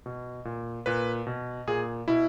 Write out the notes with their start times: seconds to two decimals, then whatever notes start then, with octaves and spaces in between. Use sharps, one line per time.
0.06 B2
0.45 A#2
0.86 A#2 B4
1.27 B2
1.67 A#2 G#4
2.08 B2 E4